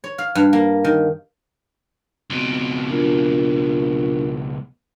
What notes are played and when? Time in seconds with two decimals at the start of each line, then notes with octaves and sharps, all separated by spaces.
0.04 C#5
0.18 F5
0.35 G2
0.53 A#3
0.84 D#3
2.30 C#2 B2 C4
2.89 D4 F4 A#4